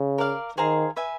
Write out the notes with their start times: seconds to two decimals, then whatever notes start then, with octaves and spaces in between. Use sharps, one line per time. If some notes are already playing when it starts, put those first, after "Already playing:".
Already playing: C#3
0.18 A#4 D5 F5
0.58 D#3 G#4 C5 F5 A#5
0.96 B4 E5 G#5